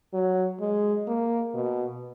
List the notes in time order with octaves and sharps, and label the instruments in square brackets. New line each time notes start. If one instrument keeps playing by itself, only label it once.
[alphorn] F#3
G#3
A#3
B2